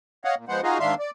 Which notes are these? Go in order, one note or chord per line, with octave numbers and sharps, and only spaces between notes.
C#5 D#5 F5 F#5
A#2
F3 G#3 B3 C5 F#5
D#4 F4 F#4 G#4 D#5 F5
G#2 D#3 D4 E5 F5 C6
D5